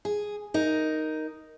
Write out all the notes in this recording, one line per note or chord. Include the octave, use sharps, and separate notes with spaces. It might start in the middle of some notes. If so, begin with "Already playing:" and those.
G#4
D#4 A#4